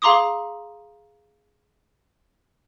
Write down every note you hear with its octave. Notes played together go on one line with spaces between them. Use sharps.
G#4 F5 A#5 C6 D6 D#6